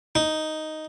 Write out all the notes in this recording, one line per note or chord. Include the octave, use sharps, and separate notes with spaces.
D#4